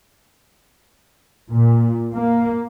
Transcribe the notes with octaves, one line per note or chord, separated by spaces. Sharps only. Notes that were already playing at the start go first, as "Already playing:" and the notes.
A#2
A#3